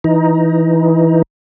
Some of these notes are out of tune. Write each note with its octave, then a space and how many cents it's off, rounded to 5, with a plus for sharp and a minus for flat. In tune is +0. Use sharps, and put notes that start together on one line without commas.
E3 +0 D#4 +15